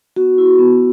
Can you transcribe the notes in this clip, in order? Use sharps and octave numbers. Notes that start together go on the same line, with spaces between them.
B3 F#4
E4
B3